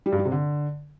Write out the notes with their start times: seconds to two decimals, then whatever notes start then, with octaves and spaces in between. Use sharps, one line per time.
0.06 G3
0.12 G2
0.19 G3
0.25 C3
0.32 D3